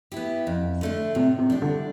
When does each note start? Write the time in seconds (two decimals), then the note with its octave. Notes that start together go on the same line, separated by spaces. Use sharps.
0.12 B3 E4 G4
0.47 F2
0.81 D3 A3 D4
1.15 A2 C3
1.39 C3
1.50 G3 D4
1.62 D3